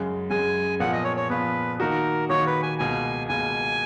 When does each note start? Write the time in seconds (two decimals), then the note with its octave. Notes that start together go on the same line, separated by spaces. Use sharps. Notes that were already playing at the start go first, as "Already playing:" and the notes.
Already playing: F#2 C#3 G#3
0.30 F#2 C#3 G#3 G#5
0.80 A#2 F3 B3 F#5
0.93 D#5
1.04 C#5
1.17 C#5
1.30 A#2 F3 B3 B4
1.80 D#3 A#3 D#4 F#4 A#4
2.29 D#3 A#3 D#4 F#4 C#5
2.46 B4
2.63 G#5
2.79 C#2 B2 A#3 G#5
3.29 C#2 B2 A#3 G#5